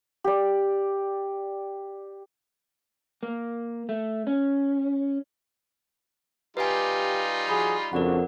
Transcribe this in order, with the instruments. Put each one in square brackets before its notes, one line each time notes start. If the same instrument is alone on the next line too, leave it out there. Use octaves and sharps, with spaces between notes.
[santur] G4 D5
[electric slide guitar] A#3
A3
C#4
[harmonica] G3 D#4 F4 [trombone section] G4 [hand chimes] B4 F5 G#5
[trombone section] F3 F#4 G#4 [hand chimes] B5
[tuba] F2 [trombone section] C#3 D4 F#4 [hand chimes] A#4 D5 F#5